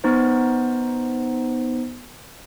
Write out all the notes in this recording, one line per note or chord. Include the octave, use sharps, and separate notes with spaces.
B3 D#4 C5